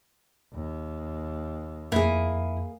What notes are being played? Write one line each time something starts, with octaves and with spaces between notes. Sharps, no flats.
D#2
F2 A#3 E4 G#4